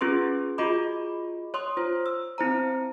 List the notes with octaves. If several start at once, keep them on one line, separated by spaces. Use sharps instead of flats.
C#4 F4 G#4 B4 C6
F4 F#4 G#4 D#5 B5 D6
C#5 C6 D#6
F4 C5
E6
C4 E4 C5 A#5